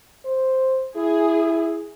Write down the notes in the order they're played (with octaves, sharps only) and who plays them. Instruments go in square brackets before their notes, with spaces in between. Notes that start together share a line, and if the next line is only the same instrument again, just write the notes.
[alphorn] C5
[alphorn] E4 [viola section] G#4